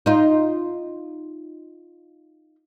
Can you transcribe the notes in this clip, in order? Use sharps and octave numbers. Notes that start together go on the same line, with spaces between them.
D#4 F4